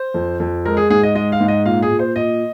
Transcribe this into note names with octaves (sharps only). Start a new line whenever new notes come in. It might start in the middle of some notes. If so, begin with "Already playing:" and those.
Already playing: C5
F2
F2
G#3 A#4
G#4
G#2 G#4
D#5
G#3 D#5
F5
G#2
D#5
A#2 F5
G#4
A#2
C5
A#2 D#5